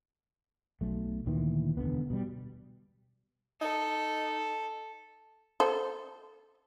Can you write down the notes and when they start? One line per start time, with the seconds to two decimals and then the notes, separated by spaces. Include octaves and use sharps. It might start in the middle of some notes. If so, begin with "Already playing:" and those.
0.81 B1 F#3 A3
1.26 D2 A#2 D#3 E3
1.77 E1 A#1 D3 B3
2.10 B2 G3
3.62 D#4 A4
5.60 A4 C5